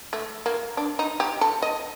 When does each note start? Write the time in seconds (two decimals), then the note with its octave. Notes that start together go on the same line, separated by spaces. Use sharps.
0.13 A3
0.46 A#3
0.77 D4
0.99 D#4
1.20 G4
1.41 A4
1.62 D#5